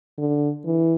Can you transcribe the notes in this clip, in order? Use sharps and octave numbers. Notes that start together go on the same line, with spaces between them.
D3
E3